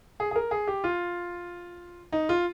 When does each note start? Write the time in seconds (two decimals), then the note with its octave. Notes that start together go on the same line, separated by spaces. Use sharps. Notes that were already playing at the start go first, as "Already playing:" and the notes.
0.20 G#4
0.31 G#4
0.36 A#4
0.51 G#4
0.67 G4
0.84 F4
2.12 D#4
2.29 F4